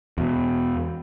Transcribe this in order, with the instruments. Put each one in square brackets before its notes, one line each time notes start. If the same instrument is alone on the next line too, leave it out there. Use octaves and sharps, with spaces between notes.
[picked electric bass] E2 B2